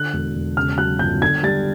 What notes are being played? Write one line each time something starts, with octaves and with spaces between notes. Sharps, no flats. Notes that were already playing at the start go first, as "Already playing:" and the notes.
Already playing: D3 F#6
E1
E1
C#3 F6
F#3 F#6
G1 G6
D3 G#6
G3 A6